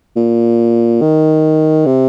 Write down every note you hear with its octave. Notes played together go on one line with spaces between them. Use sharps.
A#2
D#3
C3